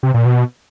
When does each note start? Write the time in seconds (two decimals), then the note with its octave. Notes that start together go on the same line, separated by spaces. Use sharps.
0.03 C3
0.14 A#2
0.25 B2